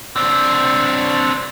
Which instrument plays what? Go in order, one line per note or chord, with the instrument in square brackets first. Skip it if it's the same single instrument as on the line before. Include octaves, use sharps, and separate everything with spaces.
[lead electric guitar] C4 D4